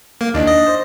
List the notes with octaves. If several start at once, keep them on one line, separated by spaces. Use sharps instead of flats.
A#3
D#2 D4 D#4
D#5
C5